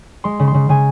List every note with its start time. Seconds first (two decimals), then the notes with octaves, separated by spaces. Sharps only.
0.24 G#3 C6
0.39 C#3
0.48 C6
0.54 C#3
0.69 C#3 G#5